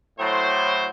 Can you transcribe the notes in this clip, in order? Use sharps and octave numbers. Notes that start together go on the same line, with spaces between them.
A2 F#3 C5